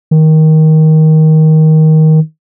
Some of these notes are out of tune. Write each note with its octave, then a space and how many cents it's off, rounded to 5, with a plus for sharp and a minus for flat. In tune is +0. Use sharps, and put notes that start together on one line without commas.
D#3 +15